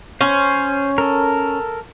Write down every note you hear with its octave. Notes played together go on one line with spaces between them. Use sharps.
C#4 C5
A4 A#4